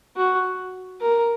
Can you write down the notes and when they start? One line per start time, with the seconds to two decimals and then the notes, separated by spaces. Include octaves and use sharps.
0.17 F#4
1.01 A#4